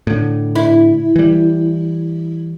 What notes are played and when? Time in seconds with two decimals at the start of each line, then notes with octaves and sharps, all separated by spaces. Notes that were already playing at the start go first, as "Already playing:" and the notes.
0.07 A2 D3
0.55 E4
1.16 E3 G3